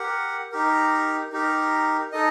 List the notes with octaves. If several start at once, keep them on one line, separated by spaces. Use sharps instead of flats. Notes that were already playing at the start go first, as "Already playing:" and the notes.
Already playing: G4 A#4 F#5
D#4 G4 A#4
D#4 G4 A#4
D#4 A4 D#5